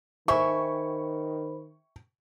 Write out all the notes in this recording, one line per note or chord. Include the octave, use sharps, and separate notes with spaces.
D#3 C5 E5 G5 G#5 B5 C#6